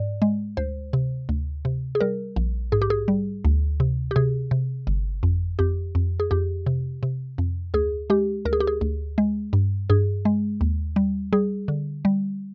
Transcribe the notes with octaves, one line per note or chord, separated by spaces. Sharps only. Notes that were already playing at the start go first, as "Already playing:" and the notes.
Already playing: G#2 D5
G#3
D2 C5
C3
D2
C3
G#4
G3 A#4
A#1
G#2 G#4
G4
G#4
G3
D2
C3
G4
C3 G#4
C3
G1
F2
F2 G4
F2
G#4
F2 G4
C3
C3
F2
D2 G#4
G#3 G4
D2 A#4
G#4
G4
G#4
D2
G#3
G2
G2 G#4
G#3
D#2
G3
G3 G#4
D3
G3